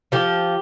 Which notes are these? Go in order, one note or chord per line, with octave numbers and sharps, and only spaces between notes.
F3 G4